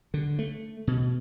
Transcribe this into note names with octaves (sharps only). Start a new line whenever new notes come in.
D3
A3
B2